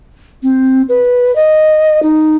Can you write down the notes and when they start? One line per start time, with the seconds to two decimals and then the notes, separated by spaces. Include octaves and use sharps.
0.43 C4
0.89 B4
1.36 D#5
2.03 D#4